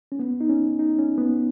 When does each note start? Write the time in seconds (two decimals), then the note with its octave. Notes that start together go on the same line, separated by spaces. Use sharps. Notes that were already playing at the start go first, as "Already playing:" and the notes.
0.12 C#4
0.19 B3
0.41 D#4
0.50 C#4
0.79 D#4
0.98 C#4
1.18 B3